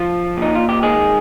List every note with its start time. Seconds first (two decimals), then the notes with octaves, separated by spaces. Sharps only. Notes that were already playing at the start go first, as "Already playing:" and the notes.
Already playing: F3 F4
0.37 A#2 D#4
0.55 F4
0.69 G4
0.83 D#3 G#3 G#4